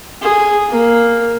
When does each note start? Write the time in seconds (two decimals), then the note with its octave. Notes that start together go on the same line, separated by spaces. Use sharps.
0.21 G#4
0.69 A#3